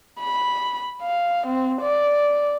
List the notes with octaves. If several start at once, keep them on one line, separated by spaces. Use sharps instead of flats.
B5
F5
C4
D5